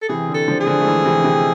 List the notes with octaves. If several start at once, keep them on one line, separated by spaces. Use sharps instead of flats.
A4
C3 E3 G#4
D3
A4
D3 F3
G#4
D3 F3
A3
E3 G#3
C3 E3
C3 E3